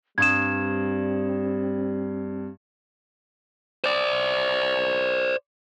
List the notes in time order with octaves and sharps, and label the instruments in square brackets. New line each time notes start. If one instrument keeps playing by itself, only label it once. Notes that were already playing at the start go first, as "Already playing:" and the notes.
[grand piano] G2 D#6 [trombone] G3 [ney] C4 [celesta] G#6 E7
[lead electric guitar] C5 D5